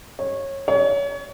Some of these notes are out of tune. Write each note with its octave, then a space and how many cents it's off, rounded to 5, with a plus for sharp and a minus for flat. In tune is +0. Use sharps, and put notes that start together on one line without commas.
C#5 -20
C#5 +30